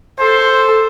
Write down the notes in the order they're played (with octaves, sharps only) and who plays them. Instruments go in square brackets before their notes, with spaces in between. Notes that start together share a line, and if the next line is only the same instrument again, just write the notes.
[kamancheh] A4 [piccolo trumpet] C5